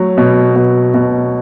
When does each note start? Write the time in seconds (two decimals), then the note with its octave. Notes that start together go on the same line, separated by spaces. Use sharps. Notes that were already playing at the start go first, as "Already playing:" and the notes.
Already playing: F#3 A3
0.18 B2
0.56 B2
0.94 B2